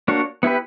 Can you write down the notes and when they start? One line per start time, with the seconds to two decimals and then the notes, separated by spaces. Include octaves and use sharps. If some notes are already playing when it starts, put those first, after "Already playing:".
0.08 A#3 D4 F#4 C#5
0.43 B3 E4 G4 B4